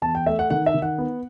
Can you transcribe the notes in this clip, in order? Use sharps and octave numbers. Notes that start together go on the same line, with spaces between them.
E2 A5
G5
A3 E5
F#5
D#3 F#5
E5
D#3
F#5
B3